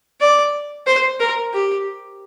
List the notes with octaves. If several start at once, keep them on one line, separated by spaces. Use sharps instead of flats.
D5
C5
A#4
G4